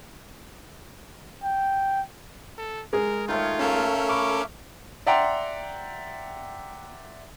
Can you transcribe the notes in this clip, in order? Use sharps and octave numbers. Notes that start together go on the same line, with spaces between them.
G5
A4
G#3 G#4 A#4
D#3 A3 F4 C#5
A3 C#4 A4 A#4 F5
B5 C#6 D6
D5 E5 F#5 G5 A#5 C6